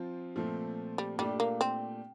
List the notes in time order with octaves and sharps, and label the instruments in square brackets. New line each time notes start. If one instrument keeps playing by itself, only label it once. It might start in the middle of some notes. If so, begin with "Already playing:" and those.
Already playing: [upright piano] F3 C4 F4
A#2 F3 A3 C4
[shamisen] G3
[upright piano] A#2 A3 D4 G4 [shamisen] G3
[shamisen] A#3
C4